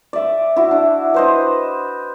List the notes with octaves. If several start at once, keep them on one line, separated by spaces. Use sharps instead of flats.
D5 E5
E4 F#4
D4
B4 C5 D#5